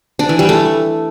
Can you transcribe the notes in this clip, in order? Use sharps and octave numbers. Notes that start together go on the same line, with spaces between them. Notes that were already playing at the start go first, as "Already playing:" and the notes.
D4
E3
G3
A3